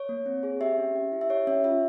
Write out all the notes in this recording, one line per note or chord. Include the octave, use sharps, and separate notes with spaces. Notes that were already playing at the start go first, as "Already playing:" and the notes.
Already playing: C#5
A#3
C4
G#4
G4 E5
C#4
G4
E4
E5
G4 C#5
C#4 E5
F4 E5